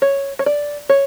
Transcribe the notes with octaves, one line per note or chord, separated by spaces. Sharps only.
C#5
C#5
D5
C#5